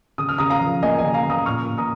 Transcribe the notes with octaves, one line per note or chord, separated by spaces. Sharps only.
C#3 D#6
F6
C#3 A#5 D#6
F5 A#5
F3
A#3 D#5 G#5
D#5 G#5
C#3
F5 A#5
C#3 A#5 D#6
A#2 C#6 F6
A#2
A#5 D#6